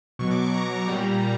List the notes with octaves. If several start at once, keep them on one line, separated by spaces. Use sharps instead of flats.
B2 F#3 C#6
D6
C#6
A#5
A#2 G3